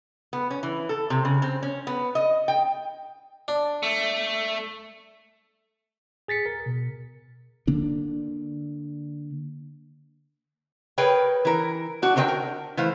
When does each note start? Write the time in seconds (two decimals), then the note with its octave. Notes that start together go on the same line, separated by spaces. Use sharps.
0.33 B3
0.51 C#4
0.63 E3
0.89 A4
1.10 C3
1.25 C#3
1.42 C4
1.63 C#4
1.87 B3
2.15 D#5
2.48 G5
3.48 D4
3.83 A3
6.28 G#4 A6 B6 C#7
6.46 A#4
6.66 B2
7.67 D3 A#3 D4
10.98 G#4 A#4 B4 C#5 G5
11.45 E3 A#4
12.02 D4 F#4 D5
12.16 D3 A#4 C5 D5 G5 A5
12.28 A#4
12.77 E3 A3 C5 F5